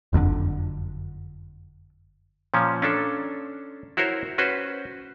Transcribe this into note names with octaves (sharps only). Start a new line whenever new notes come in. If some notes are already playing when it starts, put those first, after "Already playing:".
F#1 F2 A2 D3
A#2 F3 C#4
C#4 D4 A4
E4 F#4 A#4 C5 C#5
C#4 F#4 B4 C5